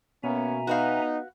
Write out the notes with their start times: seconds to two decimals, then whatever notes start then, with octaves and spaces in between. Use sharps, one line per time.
0.24 B2 A#3 B3 C#4 E5 G#5 A#5
0.67 B3 D#4 F#4 B4 F5